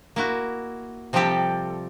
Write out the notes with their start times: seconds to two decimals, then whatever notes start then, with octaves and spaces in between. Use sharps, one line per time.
0.16 A#3 E4 F#4
1.13 C3 F3 G3 C4 G4 A4